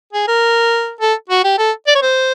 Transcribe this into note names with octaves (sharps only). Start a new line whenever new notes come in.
G#4
A#4
A4
F#4
G4
A4
D5
C#5
C5